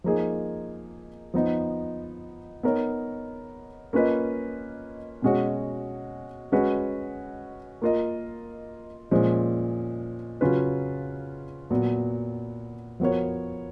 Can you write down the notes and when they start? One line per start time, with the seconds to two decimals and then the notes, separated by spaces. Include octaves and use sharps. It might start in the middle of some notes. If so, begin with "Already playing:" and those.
0.04 F3 A#3 D#4 G#4
1.34 F3 B3 D#4
2.63 B3 D#4 A#4 C#5
3.93 A#3 C#4 F4 B4 D#5
5.22 B2 G#3 C#4 F#4 C#5
6.52 G#3 C#4 F#4 B4
7.82 A#3 F4 A#4 D#5
9.11 A#2 F3 G#3 C#4
10.41 C#3 F#3 C#4 F4 B4
11.70 A#2 F#3 B3
13.00 F3 B3 F#4 A#4 C#5